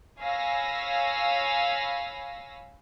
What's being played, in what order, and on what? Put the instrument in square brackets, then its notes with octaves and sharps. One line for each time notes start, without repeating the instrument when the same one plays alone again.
[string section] C#5 F5 G#5 B5 E6 A#6